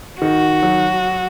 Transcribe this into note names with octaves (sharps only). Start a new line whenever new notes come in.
D#3 F#4
F#3